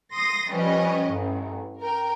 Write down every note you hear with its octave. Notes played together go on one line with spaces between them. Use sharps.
C6 D#6 A#6
F3 G3 C#4 B4 D#5
A1 G2
A#4 G5